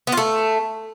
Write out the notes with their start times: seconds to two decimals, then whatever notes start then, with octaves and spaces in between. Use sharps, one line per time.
0.07 B3
0.12 F4
0.17 A3